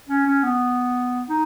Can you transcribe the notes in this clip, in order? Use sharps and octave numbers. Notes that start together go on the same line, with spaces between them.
C#4
C#4
B3
D#4